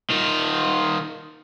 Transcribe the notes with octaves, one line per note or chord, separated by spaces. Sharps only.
D#3 F4